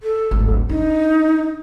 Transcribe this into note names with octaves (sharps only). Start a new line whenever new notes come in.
A4
D1 G#1
D4 D#4